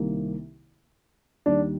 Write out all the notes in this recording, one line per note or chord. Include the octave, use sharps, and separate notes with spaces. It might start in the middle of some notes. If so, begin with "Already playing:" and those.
Already playing: C2 C3 D#3 A#3
D#2 D#3 G3 D4